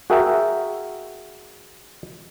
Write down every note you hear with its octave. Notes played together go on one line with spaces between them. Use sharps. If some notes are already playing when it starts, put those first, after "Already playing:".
F#4 G#4 A#4 E5 G5